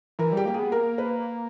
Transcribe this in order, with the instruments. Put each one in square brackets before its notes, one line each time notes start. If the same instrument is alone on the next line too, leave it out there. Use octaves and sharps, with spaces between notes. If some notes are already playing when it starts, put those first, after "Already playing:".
[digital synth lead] E3 [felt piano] A#4
[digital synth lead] G3 [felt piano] G4
[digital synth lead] A#3 [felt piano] G4
[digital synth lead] B3 [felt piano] G#4
[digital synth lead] A#3 [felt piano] A#4
[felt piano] B4